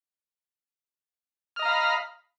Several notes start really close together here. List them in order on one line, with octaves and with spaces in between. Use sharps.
F6 D#5 A#5 F5 B5